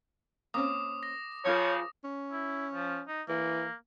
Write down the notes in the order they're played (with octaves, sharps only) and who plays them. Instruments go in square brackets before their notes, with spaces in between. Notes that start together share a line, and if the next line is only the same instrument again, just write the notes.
[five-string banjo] A#3 C4 C#4 [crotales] D6 D#6
[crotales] A#6
[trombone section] C#3 F3 [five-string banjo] F#3 F4 A#4 [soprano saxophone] C#5
[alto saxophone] C#4
[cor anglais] E4
F3
D#4
[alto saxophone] E3 [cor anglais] A#3